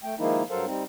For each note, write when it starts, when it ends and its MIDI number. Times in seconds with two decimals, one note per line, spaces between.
0.03 0.15 57
0.03 0.15 79
0.19 0.43 51
0.19 0.43 53
0.19 0.43 56
0.19 0.43 58
0.19 0.43 63
0.19 0.43 64
0.50 0.65 43
0.50 0.65 54
0.50 0.65 69
0.50 0.65 70
0.50 0.65 72
0.50 0.65 77
0.66 0.84 55
0.66 0.84 60
0.66 0.84 63